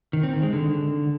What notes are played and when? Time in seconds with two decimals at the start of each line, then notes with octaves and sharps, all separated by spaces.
0.13 D#3
0.23 C4
0.33 D#3
0.43 G#3
0.53 D3